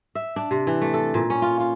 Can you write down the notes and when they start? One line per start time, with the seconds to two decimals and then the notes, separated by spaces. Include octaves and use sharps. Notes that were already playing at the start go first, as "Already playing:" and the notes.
0.15 E5
0.36 D4
0.51 C3
0.67 E3
0.82 A3
0.94 A4
1.14 A#2
1.30 C#4
1.42 F4
1.60 F4